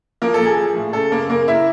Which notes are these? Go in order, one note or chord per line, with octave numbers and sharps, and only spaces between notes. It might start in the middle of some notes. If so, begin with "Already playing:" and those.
F3 A#3 A#4
A4
A#2 G#4
F3
A2
C#3 A4
F#2 A#3 A#4
C#3 A#3 A#4
E4 E5